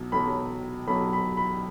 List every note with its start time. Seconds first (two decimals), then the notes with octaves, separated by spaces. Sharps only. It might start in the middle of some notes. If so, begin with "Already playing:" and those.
Already playing: B1 B2 F#3
0.12 B1 B2 F#3 B5
0.88 B1 B2 F#3 B5
1.13 B5
1.37 B5